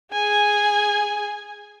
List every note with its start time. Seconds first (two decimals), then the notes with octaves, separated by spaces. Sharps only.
0.13 G#4 G#5